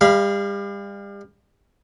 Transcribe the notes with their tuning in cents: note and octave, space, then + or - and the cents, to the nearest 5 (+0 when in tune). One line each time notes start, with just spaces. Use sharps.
G3 +35 F5 -20 B5 -30